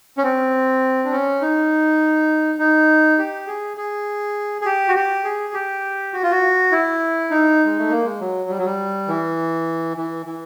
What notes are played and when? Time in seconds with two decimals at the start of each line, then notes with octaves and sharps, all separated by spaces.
0.18 C#4
0.23 C4
1.04 D4
1.12 C#4
1.41 D#4
2.59 D#4
3.18 G4
3.47 G#4
3.77 G#4
4.62 G#4
4.66 G4
4.88 F#4
4.95 G4
5.24 G#4
5.54 G4
6.13 F#4
6.23 F4
6.31 F#4
6.72 E4
7.31 D#4
7.65 G#3
7.78 A3
7.90 A#3
8.05 G#3
8.21 F#3
8.50 G3
8.58 F#3
8.66 G3
9.08 E3
9.97 E3
10.26 E3